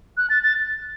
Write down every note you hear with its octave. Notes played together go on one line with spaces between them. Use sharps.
F#6
A6
A6